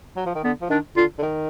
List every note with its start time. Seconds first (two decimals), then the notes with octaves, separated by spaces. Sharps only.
0.16 F#3
0.26 F3
0.35 D#3
0.44 D3 B3
0.61 F3
0.70 D#3 D4
0.96 D3 F4
1.19 D3
1.23 D#3